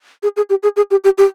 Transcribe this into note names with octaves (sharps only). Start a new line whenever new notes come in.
G#4
G#4
G4
G#4
G#4
G4
G4
G4